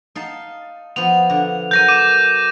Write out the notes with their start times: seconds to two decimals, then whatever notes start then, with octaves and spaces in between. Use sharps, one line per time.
0.15 D#4 F5 A5
0.96 F3 B3 F7
1.30 D3
1.71 F#3 A#4 C#5 G6 A#6 D#7
1.88 D6 D#7